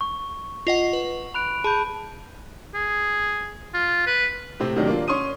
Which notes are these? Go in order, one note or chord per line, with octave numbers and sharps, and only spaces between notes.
C#6
F4 D#5 F#5
B4
B5 F#6 D7 F7
G#4 A5 B5 G6
G#4
F4
B4
A2 C3 C4
A2 C3 D#3 F#3 A#3 D4
A#3 D4 F4
C#4 C6 C#6 D#6 D#7